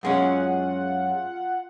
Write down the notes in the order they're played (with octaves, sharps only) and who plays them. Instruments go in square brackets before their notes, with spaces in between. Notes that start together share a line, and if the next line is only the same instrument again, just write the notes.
[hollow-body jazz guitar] F#2 G#3 C#4 [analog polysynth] F4 F#5